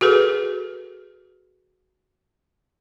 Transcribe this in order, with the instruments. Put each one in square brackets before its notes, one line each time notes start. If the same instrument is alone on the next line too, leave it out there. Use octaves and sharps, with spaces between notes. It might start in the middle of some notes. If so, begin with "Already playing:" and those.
[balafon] F#4 G#4 A4 B4